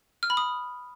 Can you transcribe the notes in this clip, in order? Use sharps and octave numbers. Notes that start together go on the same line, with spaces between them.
F6
B5
D#6